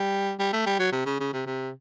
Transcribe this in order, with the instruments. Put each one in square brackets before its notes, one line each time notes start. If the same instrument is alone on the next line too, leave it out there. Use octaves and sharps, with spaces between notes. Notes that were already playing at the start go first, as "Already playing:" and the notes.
Already playing: [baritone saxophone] G3
G3
A3
G3
F#3
C3
C#3
C#3
C3
C3